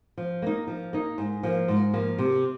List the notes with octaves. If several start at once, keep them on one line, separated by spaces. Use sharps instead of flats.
F3
A#3 D#4
F3
A#3 D#4
G#2
F3 A#3
G#2
F3 A#3
C3